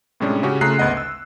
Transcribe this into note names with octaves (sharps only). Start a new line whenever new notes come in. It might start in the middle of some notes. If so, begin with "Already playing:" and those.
A2 C3 G3 G#3 C#4 D4
C#3 C#4 F#4 G4
C#3 A3 F4 A#5 F#6 C7
G#1 D2 B3 D#5 F#5
E6